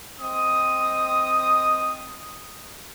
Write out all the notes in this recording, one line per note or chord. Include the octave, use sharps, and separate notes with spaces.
C4 D#5 D#6